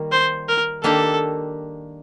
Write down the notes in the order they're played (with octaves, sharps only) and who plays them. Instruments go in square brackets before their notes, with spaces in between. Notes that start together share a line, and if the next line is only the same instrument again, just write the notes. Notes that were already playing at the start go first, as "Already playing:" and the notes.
Already playing: [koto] D#3 G3 A#3
[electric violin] C5
A#4
[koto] D#3 A#3 D4 G4 [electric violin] A4